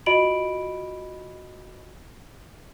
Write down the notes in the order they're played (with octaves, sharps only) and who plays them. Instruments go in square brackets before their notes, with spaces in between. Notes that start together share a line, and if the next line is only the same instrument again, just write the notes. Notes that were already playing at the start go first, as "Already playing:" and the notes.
[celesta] F4 F#4 D#5 B5 D7 F#7